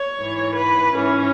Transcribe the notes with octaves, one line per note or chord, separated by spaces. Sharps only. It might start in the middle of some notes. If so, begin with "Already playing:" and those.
Already playing: C#5
G#2 E3
B4
G#2 E3 C#4